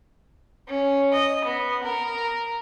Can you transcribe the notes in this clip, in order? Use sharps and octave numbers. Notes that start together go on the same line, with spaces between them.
C#4
D#5
B3
A#4